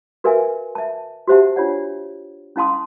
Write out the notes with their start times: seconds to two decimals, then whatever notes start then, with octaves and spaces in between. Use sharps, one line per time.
0.24 F#4 A#4 B4 E5 F5 G#5
0.75 E5 A5
1.28 F#4 G4 C5 E5 F#5 A5
1.56 D4 F4 C#5 D5 F#5
2.56 C#4 E4 F5 A5 C6 D#6